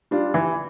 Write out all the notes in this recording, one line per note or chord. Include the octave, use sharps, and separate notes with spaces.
G3 D4 F4
E3